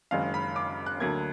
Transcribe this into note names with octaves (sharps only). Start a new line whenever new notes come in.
F#1 F#2 D#3 G#3 F5
B5
D6
F#6
D2 D3 F#3 A#3 G#6